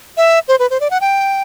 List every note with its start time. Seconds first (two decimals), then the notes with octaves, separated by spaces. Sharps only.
0.17 E5
0.48 C5
0.59 B4
0.70 C5
0.81 D5
0.91 F#5
1.01 G5